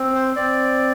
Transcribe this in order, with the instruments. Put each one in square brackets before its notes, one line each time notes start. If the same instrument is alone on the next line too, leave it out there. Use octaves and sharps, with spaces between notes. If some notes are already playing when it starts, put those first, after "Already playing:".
Already playing: [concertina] C4
C5
C4 D5